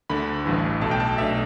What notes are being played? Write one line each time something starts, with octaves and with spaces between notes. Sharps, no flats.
D2 D3 A3 B5
A1 G2 E3
B1 B2 A3 A5
G5
A5
B1 B2 A3 D4 E5